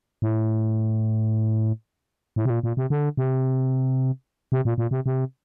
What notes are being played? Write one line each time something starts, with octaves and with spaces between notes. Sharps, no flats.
A2
A2
C3
A#2
A#2
C3
D3
C3
C3
A#2
A#2
C3
C3